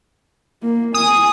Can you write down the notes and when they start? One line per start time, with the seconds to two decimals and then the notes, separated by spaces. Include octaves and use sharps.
0.63 A#3
0.94 G#5 D#6